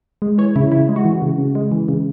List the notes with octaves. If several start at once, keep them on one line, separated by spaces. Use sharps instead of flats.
G#3
E3 C#5
C#3 E4
C#3 E4
G#3
F#4
E3
C#3
C#3
G#3
E3
C#3